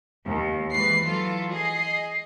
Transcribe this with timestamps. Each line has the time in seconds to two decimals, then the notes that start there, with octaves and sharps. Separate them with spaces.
0.25 D#2
0.71 G#2 E3 B4 C7
1.05 E3 F#3 F4 A4
1.51 G#4 D#5 C7